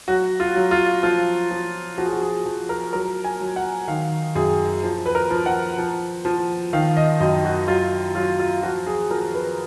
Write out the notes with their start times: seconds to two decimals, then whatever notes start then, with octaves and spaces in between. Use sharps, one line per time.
0.08 F#3 F#4
0.40 F4
0.56 F#3
0.71 F4
1.03 F3 F4
1.51 F3
1.98 F3 F#4
2.05 G#4
2.12 F#4
2.22 G#4
2.45 F3
2.69 A#4
2.93 F#3 A#4
3.24 G#5
3.41 F#3
3.56 F#5
3.88 D#3 F5
4.35 F#2 G#4
4.83 F3
5.06 B4
5.15 A#4
5.30 F3
5.46 F#5
5.78 F3
6.25 F3
6.73 D#3 F5
6.97 D#5
7.20 F#2 D#5
7.44 F#4
7.68 F#3 F4
8.15 F#3 F4
8.39 F4
8.63 F3 F#4
8.87 G#4
9.10 F3 A#4
9.34 B4